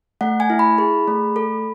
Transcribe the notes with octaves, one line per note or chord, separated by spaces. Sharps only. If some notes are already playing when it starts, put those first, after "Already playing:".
A3 F#5
G#5
E4
B5
G#4
A3
A4